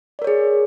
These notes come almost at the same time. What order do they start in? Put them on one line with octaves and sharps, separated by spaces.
D5 A#4 C#5 G#4